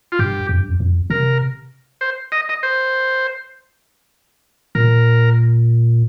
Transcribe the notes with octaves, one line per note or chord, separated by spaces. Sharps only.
F4
G2 G4
F2
G2
F2
F2
C3 A#4
C5
D#5
D#5
C5
A#2 A#4